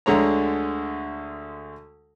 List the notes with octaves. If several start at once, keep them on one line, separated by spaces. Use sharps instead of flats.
D2 D3 G#3 C#5 A#5